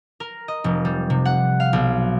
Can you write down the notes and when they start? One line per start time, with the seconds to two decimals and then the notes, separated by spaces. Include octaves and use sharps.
0.20 A#4
0.48 D#5
0.64 F1
0.85 G3
1.10 C3
1.25 F#5
1.60 F5
1.73 B1